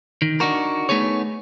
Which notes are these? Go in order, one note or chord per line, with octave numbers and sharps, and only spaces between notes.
D#3
D4 D#4 F#4 A#4
A3 B3 D#4 G#4 C#5